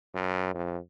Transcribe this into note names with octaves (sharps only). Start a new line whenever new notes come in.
F#2
F2